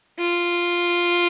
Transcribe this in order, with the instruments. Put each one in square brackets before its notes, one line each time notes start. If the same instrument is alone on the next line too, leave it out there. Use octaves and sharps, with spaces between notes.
[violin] F4